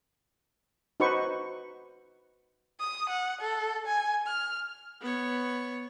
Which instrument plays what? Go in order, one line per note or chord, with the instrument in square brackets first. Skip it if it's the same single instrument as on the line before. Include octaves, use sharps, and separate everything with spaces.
[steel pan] D#4 F#4 B4 C5 C#6
[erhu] D#6
F#5
A4
G#5
F6
[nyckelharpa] B3 C#5